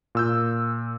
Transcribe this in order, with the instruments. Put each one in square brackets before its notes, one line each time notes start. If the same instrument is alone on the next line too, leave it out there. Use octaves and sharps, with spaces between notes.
[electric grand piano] A#2 E6 G6